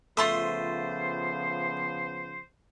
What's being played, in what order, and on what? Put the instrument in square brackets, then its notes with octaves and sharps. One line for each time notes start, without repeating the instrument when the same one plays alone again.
[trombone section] C#3 F3 B3 [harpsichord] A3 [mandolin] F4 C6 D#6 [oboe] C5